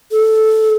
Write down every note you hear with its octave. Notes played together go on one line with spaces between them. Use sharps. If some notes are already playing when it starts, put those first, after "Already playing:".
A4